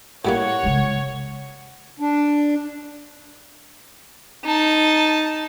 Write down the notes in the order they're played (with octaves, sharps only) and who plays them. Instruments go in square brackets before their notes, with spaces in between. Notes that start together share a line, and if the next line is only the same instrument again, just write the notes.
[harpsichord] A2 G3 A#3 [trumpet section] C#5 [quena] F#5
[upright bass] C#3 G#3
[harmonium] D4
[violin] D#4 A5